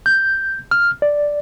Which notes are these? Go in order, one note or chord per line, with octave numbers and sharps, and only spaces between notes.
G6
F6
D5